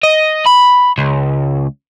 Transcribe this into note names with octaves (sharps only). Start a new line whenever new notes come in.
D#5
B5
C#2